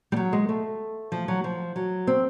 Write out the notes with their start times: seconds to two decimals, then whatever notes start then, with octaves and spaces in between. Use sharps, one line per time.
0.12 G3
0.16 F#3
0.33 G#3
0.49 A3
1.12 F3
1.28 F#3
1.44 F3
1.76 F#3
2.07 C4